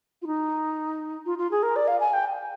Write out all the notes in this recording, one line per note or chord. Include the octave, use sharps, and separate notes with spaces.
F4
D#4
F4
F4
G#4
A#4
D5
F5
G#5
G5